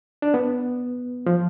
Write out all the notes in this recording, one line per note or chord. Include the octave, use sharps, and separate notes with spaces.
D4
B3
F3